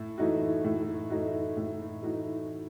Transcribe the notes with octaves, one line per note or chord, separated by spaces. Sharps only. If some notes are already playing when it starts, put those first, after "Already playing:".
Already playing: A2
E3 A3 D#4 F#4
A2
E3 A3 D#4 F#4
A2
E3 A3 D#4 F#4